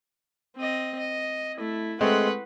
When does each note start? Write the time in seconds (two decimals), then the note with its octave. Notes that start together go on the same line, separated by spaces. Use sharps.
0.57 C4 D#5
0.99 D#5
1.57 A3 E4
2.01 G#3 A3 C4 B4 F#5